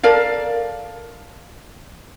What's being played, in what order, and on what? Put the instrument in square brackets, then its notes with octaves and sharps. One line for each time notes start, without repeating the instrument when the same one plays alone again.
[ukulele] A4 A#4 D5 F5